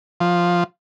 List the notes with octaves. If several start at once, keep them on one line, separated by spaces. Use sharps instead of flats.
F3